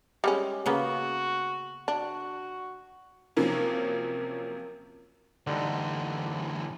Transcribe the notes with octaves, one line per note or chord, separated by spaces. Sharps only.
G3 G#3 C#4
C#3 A#3 B3 F#4
D4 F#4
C3 F3 F#3 A#3 C#4
D2 D3 E3 G3 D#4